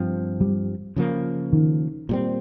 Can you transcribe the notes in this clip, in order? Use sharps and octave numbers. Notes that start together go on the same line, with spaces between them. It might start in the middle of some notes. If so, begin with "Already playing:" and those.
Already playing: G2 F3 C4
G3
C#3 F3 A#3
D#3
A#2 G3 C4